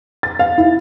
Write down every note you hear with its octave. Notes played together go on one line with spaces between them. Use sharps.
A6
F5
E4